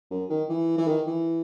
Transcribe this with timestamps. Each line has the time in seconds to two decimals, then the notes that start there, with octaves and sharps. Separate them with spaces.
0.11 F#2
0.30 D#3
0.49 E3
0.77 E3
0.87 D#3
1.07 E3